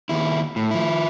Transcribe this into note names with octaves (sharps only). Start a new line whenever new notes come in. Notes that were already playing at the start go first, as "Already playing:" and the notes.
D#2 E4
A2
F3 E4